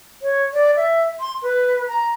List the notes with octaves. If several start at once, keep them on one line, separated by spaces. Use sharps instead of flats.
C#5
D5
E5
C6
B4
A#5